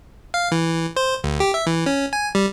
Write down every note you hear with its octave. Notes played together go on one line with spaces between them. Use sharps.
F5
E3
C5
D2
G4
E5
E3
C#4
G#5
G3